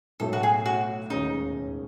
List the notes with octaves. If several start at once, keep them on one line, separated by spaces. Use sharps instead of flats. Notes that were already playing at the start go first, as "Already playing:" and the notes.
B1 A2 F#3 A3 A4
F#4
G#4
F#4
E1 D#2 D#3 G#3 C#4 D#4